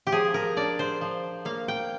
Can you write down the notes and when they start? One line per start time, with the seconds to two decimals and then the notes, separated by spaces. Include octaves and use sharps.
0.07 G4
0.12 F3 G#4
0.34 A#4
0.57 D4 D5
0.79 C5
1.01 F3
1.45 A#3 F5
1.68 G5